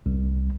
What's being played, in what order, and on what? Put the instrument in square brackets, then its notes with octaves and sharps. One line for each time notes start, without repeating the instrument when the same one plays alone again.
[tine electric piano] C2